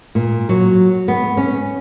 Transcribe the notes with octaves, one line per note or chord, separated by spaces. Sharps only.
A#2
F#3
B3
C#4